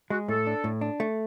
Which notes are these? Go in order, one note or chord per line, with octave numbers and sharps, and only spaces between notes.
G#3 F#4
A2 A4
D4
A2
D4
A3